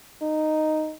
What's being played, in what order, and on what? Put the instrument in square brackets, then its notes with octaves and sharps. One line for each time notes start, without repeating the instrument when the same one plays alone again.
[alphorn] D#4